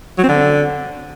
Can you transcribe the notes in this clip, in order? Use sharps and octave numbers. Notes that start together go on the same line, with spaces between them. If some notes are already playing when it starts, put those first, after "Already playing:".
F#3
C4
D3